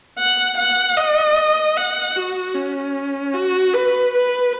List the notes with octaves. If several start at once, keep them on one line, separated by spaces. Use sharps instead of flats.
F#5
F#5
D#5
F#5
F#4
C#4
F#4
B4
B4